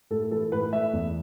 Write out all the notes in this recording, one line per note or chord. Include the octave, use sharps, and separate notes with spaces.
A2 A4
E3 A4
A2 B4
A3 E5
E2